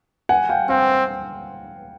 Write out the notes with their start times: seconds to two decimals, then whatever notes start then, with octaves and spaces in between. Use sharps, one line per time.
0.29 F#5 G#5
0.49 F5 G5
0.69 C4 F5 G5